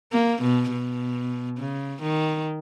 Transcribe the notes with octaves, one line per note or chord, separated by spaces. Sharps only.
A#3
B2
B2
C#3
D#3